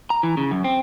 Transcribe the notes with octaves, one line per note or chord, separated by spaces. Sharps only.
A#5
E3
C#3
F#2
C4